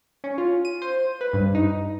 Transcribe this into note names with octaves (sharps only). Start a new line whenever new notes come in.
C#4
F4
D#7
C5
B4
G2
D#4